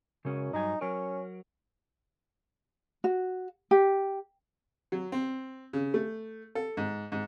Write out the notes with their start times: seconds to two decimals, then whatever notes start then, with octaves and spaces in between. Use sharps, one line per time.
0.25 F#2 C#3 G#3 C#4
0.53 G2 F#3 D#4 G#5
0.81 F#3 C#4 A#4
3.04 F#4
3.71 G4
4.92 F#3
5.12 C4
5.73 C#3
5.94 A3
6.55 A4
6.77 G#2
7.12 G#2